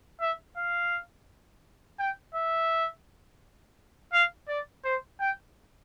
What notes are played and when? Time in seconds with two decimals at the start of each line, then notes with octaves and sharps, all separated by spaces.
0.21 E5
0.57 F5
2.00 G5
2.35 E5
4.13 F5
4.48 D5
4.85 C5
5.20 G5